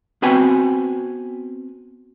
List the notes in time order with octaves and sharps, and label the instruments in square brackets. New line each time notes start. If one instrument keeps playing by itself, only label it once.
[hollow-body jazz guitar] B3 C4 F#4 B4 G5 G#5